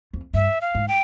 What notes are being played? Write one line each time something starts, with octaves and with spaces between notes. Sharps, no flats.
F2
G2 E5
F5
G#2
G5